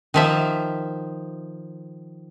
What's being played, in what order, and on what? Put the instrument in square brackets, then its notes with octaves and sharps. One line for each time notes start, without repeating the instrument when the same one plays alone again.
[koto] D#3 F3 E5